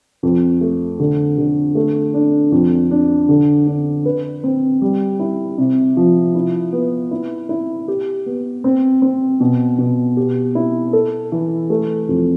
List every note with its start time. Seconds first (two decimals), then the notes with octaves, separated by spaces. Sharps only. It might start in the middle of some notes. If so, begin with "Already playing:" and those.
0.23 F2
0.61 A3
1.00 D3
1.38 D3
1.75 A3
2.14 D4
2.52 F2
2.91 D4
3.29 D3
3.67 D4
4.06 B4
4.44 C4
4.82 G3
5.19 E4
5.58 C3
5.97 F3
6.35 E4
6.73 B3
7.11 E4
7.49 E4
7.88 G4
8.26 B3
8.64 C4
9.02 C4
9.40 B2
9.78 B2
10.17 G4
10.55 E4
10.93 A4
11.32 E3
11.70 A3
12.09 F2